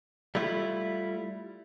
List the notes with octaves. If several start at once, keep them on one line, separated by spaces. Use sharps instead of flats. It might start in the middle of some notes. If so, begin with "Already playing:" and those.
G3 A3 E4 F4